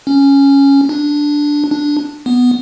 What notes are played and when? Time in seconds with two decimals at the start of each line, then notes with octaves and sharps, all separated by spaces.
0.07 C#4
0.89 D4
1.71 D4
2.26 B3